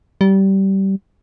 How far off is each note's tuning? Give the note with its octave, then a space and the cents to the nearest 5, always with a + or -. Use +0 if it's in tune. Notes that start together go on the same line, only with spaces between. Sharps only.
G3 -20